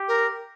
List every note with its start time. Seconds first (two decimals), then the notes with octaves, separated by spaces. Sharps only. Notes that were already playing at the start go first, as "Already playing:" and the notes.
Already playing: G4
0.08 A#4